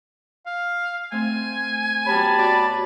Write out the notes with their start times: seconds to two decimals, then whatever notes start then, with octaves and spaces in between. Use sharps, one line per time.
0.46 F5
1.12 A3 C4 G#5
2.06 F#2 B3 G4 C#5 A5 B5
2.38 F#4 D5